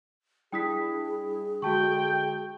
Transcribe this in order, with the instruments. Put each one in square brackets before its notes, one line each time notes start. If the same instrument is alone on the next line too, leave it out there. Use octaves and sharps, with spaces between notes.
[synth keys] G3 D4 E4 [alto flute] G#4 [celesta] G5 D#6 B6
[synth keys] D3 G#3 [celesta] F#4 A5 C#6 [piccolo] G5